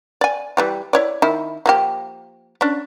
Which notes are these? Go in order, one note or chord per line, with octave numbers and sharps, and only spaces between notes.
D5 G#5
E3 G3 G4
E4 C#5 D5
D#3 E4
F3 A#3 G4
C#4 D4